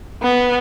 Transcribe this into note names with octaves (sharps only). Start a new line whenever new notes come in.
B3